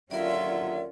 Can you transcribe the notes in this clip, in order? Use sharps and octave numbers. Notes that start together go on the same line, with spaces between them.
D#2 D3 F#3 C#4 F4 A#4 D5 E5